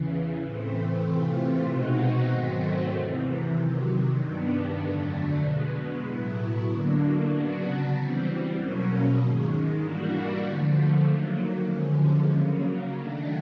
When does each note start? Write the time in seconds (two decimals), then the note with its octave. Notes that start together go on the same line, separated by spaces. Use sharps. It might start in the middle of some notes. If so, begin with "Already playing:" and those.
Already playing: E2 C#3 E3
0.42 A2 E3 A3 C4
1.04 C3 E3 A3 C4 F4
1.67 B2 G#3 C4 D#4 F#4
2.29 G#2 D#3 F#3 A3 C4
2.92 E2 C3 E3
3.55 C3 D#3 F#3
4.17 G2 D#3 G3 B3 D4
4.79 F2 D3 F#3 A3 D4
5.42 B2 G#3 B3
6.04 A2 F#3 B3 E4
6.67 D3 F#3 A#3 D4
7.30 C#3 F#3 B3 D4 F#4
7.92 E3 G3 C4
8.55 E2 B2 F#3 A#3 C#4
9.17 G#2 D#3 G#3
9.79 E3 G3 A#3 D4 F#4
10.42 D3 F3 A3
11.05 D#3 F#3 A#3
11.66 D3 F3 G#3 C#4
12.30 C#3 F#3 A#3
12.92 D#3 F#3 A3 D4